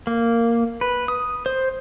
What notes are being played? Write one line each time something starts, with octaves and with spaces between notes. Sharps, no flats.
A#3
B4
D#6
C5